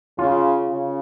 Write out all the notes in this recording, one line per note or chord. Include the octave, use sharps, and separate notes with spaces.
C#3 F4
C#3